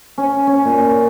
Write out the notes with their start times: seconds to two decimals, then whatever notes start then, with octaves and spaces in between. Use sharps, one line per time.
0.18 C#4
0.47 C#4
0.65 A#2